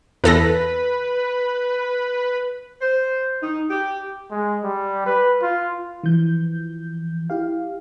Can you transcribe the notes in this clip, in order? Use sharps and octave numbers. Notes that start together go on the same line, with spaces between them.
E2 A4 B4 A#6
C5
D#4
G4
G#3
G3
B4
F4
E3 F3 G6
E4 G4 F5